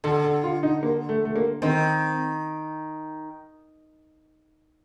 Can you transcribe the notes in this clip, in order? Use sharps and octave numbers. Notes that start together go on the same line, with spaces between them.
D3 A4
A4
F4
D#4
A#3
A3
A3
A#3
D#3 C4